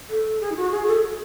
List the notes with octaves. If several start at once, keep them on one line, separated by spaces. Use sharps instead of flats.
A4
G#4
E4
F#4
G#4
A4